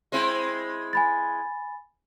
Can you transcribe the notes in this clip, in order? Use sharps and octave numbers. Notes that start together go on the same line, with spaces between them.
G#3 C4 E4
G#5 B5 A6